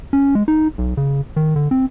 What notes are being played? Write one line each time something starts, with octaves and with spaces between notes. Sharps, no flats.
C#4
G#3
D#4
B1
C#3
D#3
D3
C4